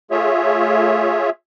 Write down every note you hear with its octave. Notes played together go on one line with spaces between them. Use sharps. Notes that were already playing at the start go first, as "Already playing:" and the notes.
A3 F4 G#4 C#5 E5